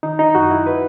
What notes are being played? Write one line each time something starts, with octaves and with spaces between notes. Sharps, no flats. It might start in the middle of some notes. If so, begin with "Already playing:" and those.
D#3 D#4
D#4
F#2 F#4
E4
B4